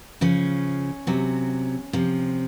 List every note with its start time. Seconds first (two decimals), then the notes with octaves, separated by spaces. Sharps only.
0.21 C#3 F3 C#4
1.07 C3 F#3
1.93 C3 F3